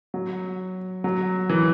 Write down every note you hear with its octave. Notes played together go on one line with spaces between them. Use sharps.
F#3
F#3
E3